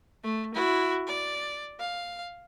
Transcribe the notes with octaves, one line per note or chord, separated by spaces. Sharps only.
A3
E4 F#4
D5
F5